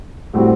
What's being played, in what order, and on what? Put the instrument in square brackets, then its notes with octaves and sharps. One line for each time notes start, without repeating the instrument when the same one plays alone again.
[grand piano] A2 G3 C4 F#4